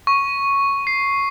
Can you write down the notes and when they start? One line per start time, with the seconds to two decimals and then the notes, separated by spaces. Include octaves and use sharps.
0.07 C#6
0.87 C7